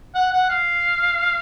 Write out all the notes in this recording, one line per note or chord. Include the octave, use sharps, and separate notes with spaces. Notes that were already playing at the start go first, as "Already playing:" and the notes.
F#5
F#5
F5